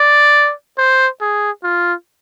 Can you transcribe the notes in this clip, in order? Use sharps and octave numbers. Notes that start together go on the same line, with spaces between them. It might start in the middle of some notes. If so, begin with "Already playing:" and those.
Already playing: D5
C5
G#4
F4